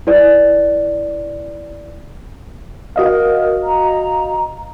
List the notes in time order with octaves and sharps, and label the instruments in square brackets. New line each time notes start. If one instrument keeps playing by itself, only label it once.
[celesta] E4 B4 D5
[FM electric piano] F#4 D#5 F5 [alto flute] A#4
[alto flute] A#5